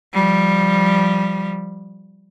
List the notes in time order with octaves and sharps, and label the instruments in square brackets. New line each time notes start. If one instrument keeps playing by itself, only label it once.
[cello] F3 G3